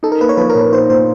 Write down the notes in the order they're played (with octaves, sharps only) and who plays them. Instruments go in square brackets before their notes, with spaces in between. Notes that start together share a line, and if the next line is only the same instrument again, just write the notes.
[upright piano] D#4 [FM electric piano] A4
[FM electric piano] A#4
[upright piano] A#3 [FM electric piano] B4
[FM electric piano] C#5
[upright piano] F3 [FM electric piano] B4
[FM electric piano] A#4
[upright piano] A#2
[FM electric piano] A#4
[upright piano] D#4 [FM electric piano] C5
[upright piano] A#2 [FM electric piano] C5